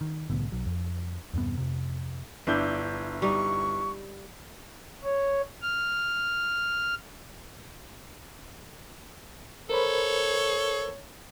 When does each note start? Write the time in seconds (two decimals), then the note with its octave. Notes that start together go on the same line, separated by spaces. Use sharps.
0.01 D#3
0.30 C2 A2 D3 B3
0.52 B1 F#3
0.66 F2
1.34 E2 G2 C3 B3
1.57 F2 C3
2.47 G1 D4 E4 G6
3.22 G3 D#4 C#6
5.04 C#5
5.62 F6
9.69 A4 A#4 C5 C#5 B5